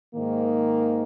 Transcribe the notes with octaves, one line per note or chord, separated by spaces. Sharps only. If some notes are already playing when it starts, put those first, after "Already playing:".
G#2 D#3 A#3